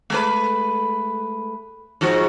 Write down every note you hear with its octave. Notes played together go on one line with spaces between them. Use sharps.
G#3 A3 B4
G#2 F3 F#4